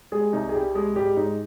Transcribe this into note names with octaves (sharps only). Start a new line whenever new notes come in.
G3 G#3 G#4
C2 D#4
G#4
C3 G3 G4
G3 G#3 G#4
G#2 G3 G4
G#2 D#4